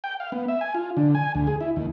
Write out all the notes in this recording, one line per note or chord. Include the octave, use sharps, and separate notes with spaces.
G5
F5
B3
E5
G#5
F4
D3
G#5
D2
G#4
E4
D#2